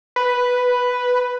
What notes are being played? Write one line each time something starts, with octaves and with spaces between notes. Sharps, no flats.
B4